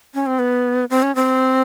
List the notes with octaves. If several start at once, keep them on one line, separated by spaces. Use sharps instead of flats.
C#4
C4
B3
C4
C#4
C4